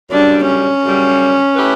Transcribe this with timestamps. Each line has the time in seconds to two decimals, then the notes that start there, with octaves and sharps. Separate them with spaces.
0.11 F#2 C#3 G3 D4
0.47 C#4
0.84 F#2 C#3 G3
1.55 A3 E4 G4 B4